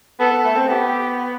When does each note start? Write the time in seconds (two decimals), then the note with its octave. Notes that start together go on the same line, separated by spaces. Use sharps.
0.20 B3 A4
0.32 B3
0.44 A3
0.56 C4
0.68 B3 G4